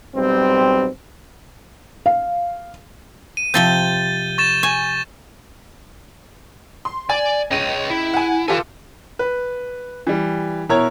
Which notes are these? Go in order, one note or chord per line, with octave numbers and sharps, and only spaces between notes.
B1 G3 C4
F5
D#7
C3 F3 C4 G6 A6 G7
C#6 A6 E7
G#5 C#6
C6
D5 G#5
C#2 C#5 D#5 D#7
E4
F#5 G#5
F4 G4 A4 B4 G#5
B4
E3 G3
B2 E4 A#4 C#5 A#5 G#6